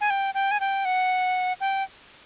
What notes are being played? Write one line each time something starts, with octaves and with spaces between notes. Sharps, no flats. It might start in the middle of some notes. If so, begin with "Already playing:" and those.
G#5
G5
G5
G#5
G5
F#5
G5